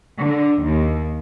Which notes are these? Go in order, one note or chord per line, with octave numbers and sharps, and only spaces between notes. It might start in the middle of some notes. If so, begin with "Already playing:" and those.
D3
D#2